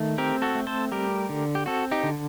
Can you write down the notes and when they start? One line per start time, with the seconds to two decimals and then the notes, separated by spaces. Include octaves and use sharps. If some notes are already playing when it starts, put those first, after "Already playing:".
Already playing: D#3 A3
0.18 C4 G4 A#4
0.42 F#4 A4
0.55 A3
0.67 A4 C5
0.92 G3 G4 A#4
1.29 D3
1.55 G4
1.66 C4 F#4 A4
1.91 D#4 G4
2.03 D3